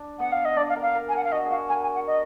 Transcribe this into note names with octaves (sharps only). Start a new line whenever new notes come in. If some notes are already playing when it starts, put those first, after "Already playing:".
Already playing: D4
B3 F#5
F5
D#5
D4 D5
F5
A#4
F5
A#4
G#5
A#4 F#5
F5
F#4 D#5
F#4 G#4 F5
A#4 G#5
G#5
F#5
D#5